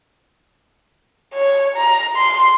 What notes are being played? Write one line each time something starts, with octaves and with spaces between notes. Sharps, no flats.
C#5
A#5
C6